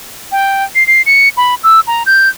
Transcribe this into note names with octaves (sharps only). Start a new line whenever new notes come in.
G5
C7
C7
C#7
B5
E6
A#5
G6